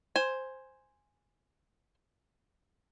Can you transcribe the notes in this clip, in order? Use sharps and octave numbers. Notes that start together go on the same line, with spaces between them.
C5 G#5